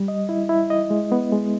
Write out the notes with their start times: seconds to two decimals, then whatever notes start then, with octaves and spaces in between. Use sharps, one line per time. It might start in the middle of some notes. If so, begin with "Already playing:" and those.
Already playing: G3
0.08 D#5
0.29 E4
0.49 E4
0.70 D#5
0.90 G#3
1.12 B3
1.32 G#3